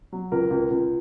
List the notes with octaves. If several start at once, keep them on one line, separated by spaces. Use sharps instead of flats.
F#3
C#2 A#4
C#2
C#2